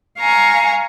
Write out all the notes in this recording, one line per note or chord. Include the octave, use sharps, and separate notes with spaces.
F5 G#5 A#5 C#6